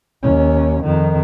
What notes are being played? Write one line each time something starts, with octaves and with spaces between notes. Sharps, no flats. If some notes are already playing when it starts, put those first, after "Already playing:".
D#2 C#4
F2 D#3